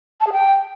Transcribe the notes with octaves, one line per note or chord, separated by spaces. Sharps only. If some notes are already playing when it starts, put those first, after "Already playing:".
A5
G#4
G5